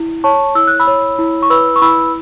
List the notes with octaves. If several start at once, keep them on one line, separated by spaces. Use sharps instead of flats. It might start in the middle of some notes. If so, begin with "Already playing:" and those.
Already playing: E4
C#5 A5 C#6
E4 E6
F#6
B5 E6
C#5
E4
C#6
B4 B5 E6
C#6
E4 B5 E6